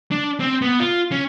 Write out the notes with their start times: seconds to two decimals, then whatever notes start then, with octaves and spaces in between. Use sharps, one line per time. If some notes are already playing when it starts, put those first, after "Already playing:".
0.11 D4
0.40 C4
0.62 B3
0.80 F4
1.12 C#4